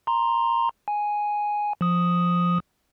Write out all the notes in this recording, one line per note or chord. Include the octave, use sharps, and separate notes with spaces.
A#5 C6
G#5
F3 D#6